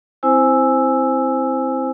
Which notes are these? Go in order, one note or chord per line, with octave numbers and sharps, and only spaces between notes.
C4 E4 C5 G#5 E6